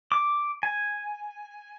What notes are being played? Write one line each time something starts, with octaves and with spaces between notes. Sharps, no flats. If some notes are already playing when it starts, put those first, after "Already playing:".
D6
G#5